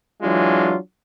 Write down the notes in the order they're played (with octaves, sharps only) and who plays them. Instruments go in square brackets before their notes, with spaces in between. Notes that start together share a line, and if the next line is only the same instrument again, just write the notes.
[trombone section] E3 F#3 G#3 D4 F4